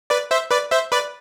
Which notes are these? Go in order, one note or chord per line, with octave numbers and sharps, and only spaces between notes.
B4 D5
C5 E5
B4 D5
C5 E5
B4 D5